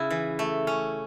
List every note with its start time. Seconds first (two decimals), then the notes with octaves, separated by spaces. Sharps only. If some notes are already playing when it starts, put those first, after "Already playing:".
Already playing: C#3 E4
0.11 E3
0.39 A3
0.67 C#4